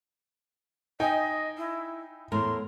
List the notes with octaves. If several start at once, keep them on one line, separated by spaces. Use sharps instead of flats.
D#4 D#5 G5 G#5
E4
E2 A2 A#4 C6